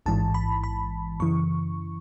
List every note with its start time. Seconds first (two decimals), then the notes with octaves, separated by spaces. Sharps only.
0.06 A1 G#2 E3 A5
0.34 B5
0.64 B5
1.20 F#2 C#3 E3 C#6